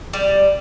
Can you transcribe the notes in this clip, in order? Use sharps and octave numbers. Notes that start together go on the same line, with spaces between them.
G3